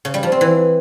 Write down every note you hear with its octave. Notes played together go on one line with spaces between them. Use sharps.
C#3
G3
F3
C4
E3